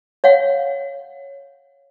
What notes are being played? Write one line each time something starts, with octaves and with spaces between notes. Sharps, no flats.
C#5 F5 F#5